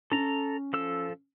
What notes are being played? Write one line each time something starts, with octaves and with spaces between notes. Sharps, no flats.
C#4 A4 A#5
F3 A4 E6